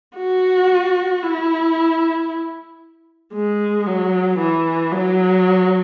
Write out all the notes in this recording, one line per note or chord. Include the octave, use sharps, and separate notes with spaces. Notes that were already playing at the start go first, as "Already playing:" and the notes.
F#4
E4
G#3
F#3
E3
F#3